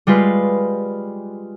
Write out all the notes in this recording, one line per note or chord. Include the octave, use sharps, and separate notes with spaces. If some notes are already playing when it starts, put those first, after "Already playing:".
G3 G#3 F4 B4